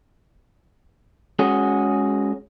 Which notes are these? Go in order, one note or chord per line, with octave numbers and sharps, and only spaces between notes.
G#3 C#4 F#4 G#4